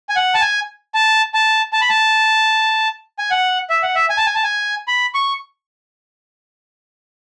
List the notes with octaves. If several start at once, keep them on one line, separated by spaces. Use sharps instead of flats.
G#5
F#5
A5
G#5
A5
A5
A5
B5
A5
G#5
F#5
E5
F#5
E5
G#5
A5
G#5
A5
G#5
B5
C#6